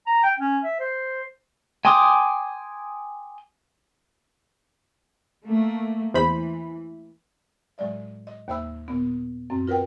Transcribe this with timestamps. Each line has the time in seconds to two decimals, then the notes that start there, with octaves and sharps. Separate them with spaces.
0.07 A#5
0.23 G5
0.39 C#4
0.64 E5
0.79 C5
1.85 G5 G#5 C6 D6 D#6
5.46 A3 A#3
6.14 E2 E3 C5 B5
7.78 A2 F#3 G#3 D5 E5
8.27 D#5
8.48 D#2 A#3 C5 E5 B5 E6
8.88 A#2 B3
9.50 F#2 C4
9.67 F4 A#4 B4 F#5 G5